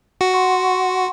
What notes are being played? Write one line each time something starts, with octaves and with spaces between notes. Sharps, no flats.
F#4
F#5 C6 C#6